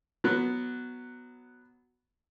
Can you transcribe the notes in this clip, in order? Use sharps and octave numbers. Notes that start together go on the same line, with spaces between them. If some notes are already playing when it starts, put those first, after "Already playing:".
F#3 B3